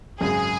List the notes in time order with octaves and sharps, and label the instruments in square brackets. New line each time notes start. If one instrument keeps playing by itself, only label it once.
[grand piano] G#1 F#2 C#3 [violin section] G#4